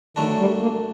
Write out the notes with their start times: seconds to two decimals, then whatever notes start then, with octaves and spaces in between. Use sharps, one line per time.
0.16 F#2 D3 D#3 F#3 A3 D4
0.39 G3
0.61 A#3